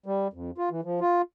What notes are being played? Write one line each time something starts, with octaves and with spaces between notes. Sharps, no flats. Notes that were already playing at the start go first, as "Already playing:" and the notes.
G3
F2
F4
E3
F3
F4